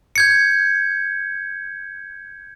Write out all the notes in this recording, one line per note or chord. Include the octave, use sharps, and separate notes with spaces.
G6 G#6 C#7